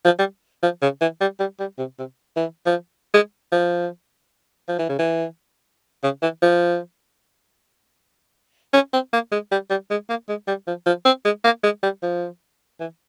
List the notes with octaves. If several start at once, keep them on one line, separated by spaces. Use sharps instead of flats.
F3
G3
F3
C#3
E3
G3
G3
G3
C3
C3
E3
F3
G#3
F3
F3
E3
C#3
E3
C#3
E3
F3
C#4
C4
A#3
G#3
G3
G3
G#3
A#3
G#3
G3
F3
F3
C4
G#3
A#3
G#3
G3
F3
E3